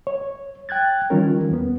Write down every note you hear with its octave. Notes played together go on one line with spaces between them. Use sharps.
C#5
G5 F#6 G#6 A6
D#3 E3 G3 C#4 F4 A#4
E2 B3